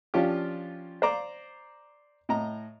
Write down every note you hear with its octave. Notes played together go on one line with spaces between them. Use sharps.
F3 C#4 D4 F4 G4
C5 D5 A#5 D6
A2 D#5 A#5